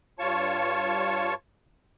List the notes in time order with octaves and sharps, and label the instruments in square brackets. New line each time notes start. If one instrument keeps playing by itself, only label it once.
[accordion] G2 F4 C#5 A5 C#6